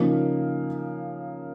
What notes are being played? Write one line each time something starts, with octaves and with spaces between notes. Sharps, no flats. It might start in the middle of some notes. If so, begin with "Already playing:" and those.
Already playing: C#3 F3 A#3 D#4